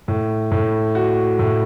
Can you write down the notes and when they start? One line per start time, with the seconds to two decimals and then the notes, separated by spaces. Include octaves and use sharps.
0.08 A2
0.51 A2
0.95 F#4
1.39 A2